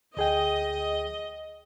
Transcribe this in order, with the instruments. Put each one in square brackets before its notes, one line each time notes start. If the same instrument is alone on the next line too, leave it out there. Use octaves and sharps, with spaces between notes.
[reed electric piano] D2 G#4 G5 [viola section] D#5